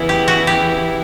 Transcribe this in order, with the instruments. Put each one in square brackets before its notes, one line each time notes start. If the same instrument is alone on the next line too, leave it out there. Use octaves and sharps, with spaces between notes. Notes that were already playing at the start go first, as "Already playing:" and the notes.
Already playing: [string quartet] E2 C#3 E3 B3 E4
[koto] G4
F#4
G4